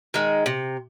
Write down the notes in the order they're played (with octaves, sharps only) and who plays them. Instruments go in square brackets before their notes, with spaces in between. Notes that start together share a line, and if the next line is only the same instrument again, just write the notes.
[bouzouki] D#3 G#3
C3